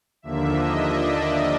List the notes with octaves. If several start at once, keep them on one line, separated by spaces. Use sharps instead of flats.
D#2 D3 F3 A#3 D4 E5
D#5
D5